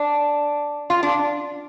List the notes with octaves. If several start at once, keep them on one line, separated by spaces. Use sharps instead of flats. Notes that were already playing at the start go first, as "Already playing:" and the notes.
Already playing: D4
F4
D4